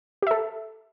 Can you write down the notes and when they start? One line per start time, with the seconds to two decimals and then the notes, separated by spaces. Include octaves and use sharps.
0.22 G4
0.27 E5
0.31 A4